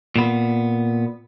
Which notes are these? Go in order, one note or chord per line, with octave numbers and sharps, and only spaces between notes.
A#2 B3